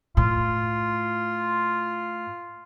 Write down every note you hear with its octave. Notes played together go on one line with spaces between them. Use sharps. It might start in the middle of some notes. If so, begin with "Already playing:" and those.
A2 F4